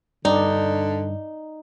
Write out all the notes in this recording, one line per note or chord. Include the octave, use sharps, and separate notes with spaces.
G2 D3 D#4 D5